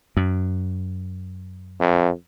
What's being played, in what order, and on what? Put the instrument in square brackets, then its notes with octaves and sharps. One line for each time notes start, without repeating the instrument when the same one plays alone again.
[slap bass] F#2
[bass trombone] F2